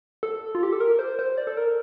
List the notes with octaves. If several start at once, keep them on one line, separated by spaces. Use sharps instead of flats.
A4
F4
G4
A4
A#4
C5
C5
D5
A4
A#4